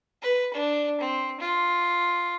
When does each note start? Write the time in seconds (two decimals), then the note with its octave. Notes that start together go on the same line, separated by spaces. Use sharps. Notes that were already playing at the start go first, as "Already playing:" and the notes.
0.22 B4
0.53 D4
1.00 C4
1.40 F4